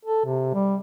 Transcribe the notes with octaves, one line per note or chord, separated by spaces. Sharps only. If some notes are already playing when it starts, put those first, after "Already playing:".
A4
C3
G3